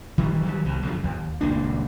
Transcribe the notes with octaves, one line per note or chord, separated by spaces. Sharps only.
D#3 E3 G3
D#3 F#3 G3
C2 B2
F#2 D3 D#3 F3
D#2
D#1 C#2 A#3 D4